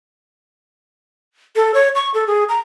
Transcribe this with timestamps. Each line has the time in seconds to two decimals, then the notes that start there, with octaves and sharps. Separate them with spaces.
1.56 A4
1.74 C#5
1.95 C#6
2.14 A4
2.27 G#4
2.49 A#5